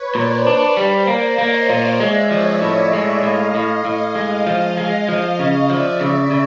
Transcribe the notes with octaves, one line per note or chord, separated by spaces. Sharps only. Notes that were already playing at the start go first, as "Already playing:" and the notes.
Already playing: B4 C#5
A#2 C5 D5
D4
G3
A#3
A#3 C#5 D#5
A#2 D#5 F5
G#3 D5 E5
F3 C#5 D#5
A2 D5 E5
G#3 C#5 D#5
A2 D#5 F5
A2
A2
G#3
F3
G#3
F3
C#3
F3 D5 E5
C#3
C#3